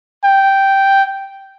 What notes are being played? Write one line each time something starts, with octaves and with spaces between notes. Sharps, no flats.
G5